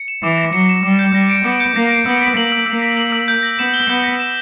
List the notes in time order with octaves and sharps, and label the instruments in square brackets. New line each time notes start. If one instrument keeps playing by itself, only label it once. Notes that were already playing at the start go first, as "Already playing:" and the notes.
Already playing: [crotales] C#7
E7
[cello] E3 [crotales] D6
[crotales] A#6
[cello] F#3 [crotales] C#7
[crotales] E7
[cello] G3 [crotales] D6
[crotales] G6
[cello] G3 [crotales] A#6
[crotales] D7
[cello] B3 [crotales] D6
[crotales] G6
[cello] A#3 [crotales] A#6
[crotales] D7
[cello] B3 [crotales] E6
[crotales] B6
[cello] A#3 [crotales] F#7
[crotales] E6
[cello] A#3 [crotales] E6
[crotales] B6
F#7
E6
G6
A#6
[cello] B3 [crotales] E7
[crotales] G7
[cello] B3 [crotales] G6
[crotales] A#6
E7